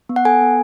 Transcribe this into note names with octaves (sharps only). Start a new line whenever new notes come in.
B3
F#5
A4 G#5
B3